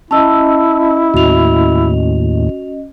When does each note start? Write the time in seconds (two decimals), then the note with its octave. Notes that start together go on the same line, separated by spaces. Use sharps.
0.11 C#4 E4 D#5 A5 E6
1.14 D#2 A2 F#4 F7